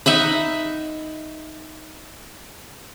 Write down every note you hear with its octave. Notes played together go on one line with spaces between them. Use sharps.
D#4 E5 F#5 B5